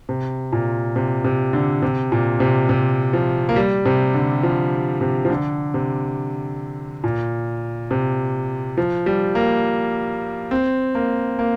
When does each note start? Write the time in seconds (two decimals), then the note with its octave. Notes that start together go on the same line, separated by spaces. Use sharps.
0.09 C3
0.53 A#2
0.96 C3
1.24 C3
1.53 D3
1.82 C3
2.12 A#2
2.40 C3
2.69 C3
3.13 F3
3.49 A#3
3.56 G3
3.85 C3
4.14 D3
4.43 F3
5.01 C3
5.25 F3
5.30 D3
5.74 C3
7.04 A#2
7.91 C3
8.77 F3
9.06 G3
9.35 A#3
10.51 C4
10.95 A#3
11.39 A#3